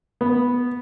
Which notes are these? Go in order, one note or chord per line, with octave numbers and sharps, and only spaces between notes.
B3